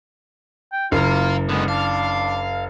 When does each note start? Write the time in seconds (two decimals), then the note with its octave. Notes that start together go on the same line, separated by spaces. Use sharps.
0.73 G5
0.92 F#1 F4 F5 A#5
1.49 D3 G#3 B3
1.68 D4 F5